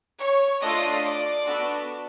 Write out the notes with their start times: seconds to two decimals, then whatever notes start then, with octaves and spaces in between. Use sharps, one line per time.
0.19 C#5 C#6
0.61 A3 D4 F4 A4 D#5 D#6
1.03 D5 D6
1.46 B3 D4 F#4 A4